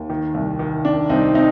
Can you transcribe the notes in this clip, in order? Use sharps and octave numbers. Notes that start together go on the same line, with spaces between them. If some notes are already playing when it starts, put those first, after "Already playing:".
Already playing: D#2
D#3
C2
D#3
D#3 D4
C2 C4 D#4
C4 D#4